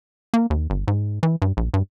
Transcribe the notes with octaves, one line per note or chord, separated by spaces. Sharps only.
A#3
D#2
G1
G#2
E3
G2
A#1
G2